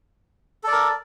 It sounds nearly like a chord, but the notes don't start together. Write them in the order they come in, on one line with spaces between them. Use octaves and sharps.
A4 D5 A#4